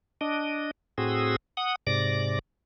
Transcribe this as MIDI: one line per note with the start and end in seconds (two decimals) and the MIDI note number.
0.21 0.71 62
0.21 0.71 75
0.98 1.36 45
0.98 1.36 60
0.98 1.36 66
0.98 1.36 68
0.98 1.36 87
0.98 1.36 88
1.57 1.75 78
1.57 1.75 87
1.87 2.39 44
1.87 2.39 48
1.87 2.39 74
1.87 2.39 86
1.87 2.39 94